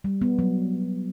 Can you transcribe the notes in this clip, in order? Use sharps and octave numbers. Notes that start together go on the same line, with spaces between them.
G3
B3
F#3